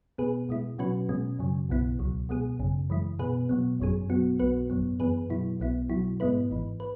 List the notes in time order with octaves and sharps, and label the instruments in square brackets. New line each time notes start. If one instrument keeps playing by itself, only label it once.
[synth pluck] B2 B3 G#4 B4
B2 G#3 E4
B2 F#3 C#4 F#4 B4
B2 G#3 C#4
F#2 C#3 F#3
B1 B2 B3 E4
C#2 B2 F#3
B2 G#3 B3 G#4
G#1 F#2 C#3
F#2 E3 G#3 E4
B2 B3 G#4 B4
B2 F#3 B3
G#1 F#2 F#3 C#4 G#4
B2 F#3 B3 F#4
B1 B2 B3 F#4 B4
G#1 F#2 F#3 B3
F#2 E3 B3 G#4 B4
B2 F#3 E4
B1 B2 B3 E4
B2 F#3 E4
G#2 G#3 B3 E4 B4
G#1 G#2 E3
B4